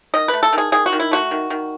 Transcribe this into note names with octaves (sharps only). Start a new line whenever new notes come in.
D#3 D#5
A3 B4
A4
D#3
G#4
D#3 G#4
F#4
D#3
E4
A3 F#4
D#3
D#3